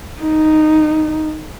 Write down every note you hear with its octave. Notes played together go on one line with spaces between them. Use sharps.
D#4